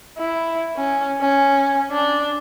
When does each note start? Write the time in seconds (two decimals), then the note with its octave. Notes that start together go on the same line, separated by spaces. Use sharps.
0.18 E4
0.76 C#4
1.21 C#4
1.91 D4